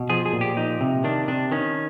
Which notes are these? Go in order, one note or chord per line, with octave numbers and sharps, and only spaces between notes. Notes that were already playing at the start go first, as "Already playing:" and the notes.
Already playing: B2
F3 G#4
G#4
A#2
G4
F3 D#4
C3
D#3 D4
C3 D4
D#3 C#4